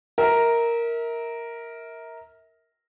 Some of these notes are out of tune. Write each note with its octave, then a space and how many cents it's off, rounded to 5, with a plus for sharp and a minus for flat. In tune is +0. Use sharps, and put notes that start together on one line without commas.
A#4 +0 E5 -35